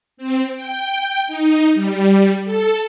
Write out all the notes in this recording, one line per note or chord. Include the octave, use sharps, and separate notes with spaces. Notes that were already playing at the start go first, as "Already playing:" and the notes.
C4
G5
D#4
G3
A4